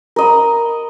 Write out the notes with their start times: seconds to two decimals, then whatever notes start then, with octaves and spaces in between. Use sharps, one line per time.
0.16 A#4 D#5 B5